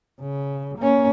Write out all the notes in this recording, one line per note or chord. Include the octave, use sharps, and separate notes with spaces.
C#3
A#3 C#4